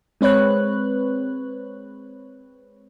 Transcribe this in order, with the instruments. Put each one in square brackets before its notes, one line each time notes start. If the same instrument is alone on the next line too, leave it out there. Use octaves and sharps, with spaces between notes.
[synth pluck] G#3 C4 B4 C#5 F#6